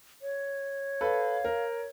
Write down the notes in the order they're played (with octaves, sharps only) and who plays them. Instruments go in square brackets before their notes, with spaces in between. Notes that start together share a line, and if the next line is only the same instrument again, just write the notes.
[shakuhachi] C#5
[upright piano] A4 B4 [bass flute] F5
[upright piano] A#4